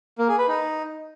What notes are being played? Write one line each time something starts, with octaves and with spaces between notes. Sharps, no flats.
A#3
G#4
B4
D#4